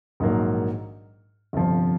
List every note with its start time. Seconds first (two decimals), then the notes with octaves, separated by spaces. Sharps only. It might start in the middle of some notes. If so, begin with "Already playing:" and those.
0.20 A#1 G#2 D#3 F#3 A#3
1.53 G1 F2 C3 F3